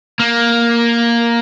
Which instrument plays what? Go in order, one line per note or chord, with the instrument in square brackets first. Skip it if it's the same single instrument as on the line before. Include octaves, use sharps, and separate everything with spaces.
[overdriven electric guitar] A#3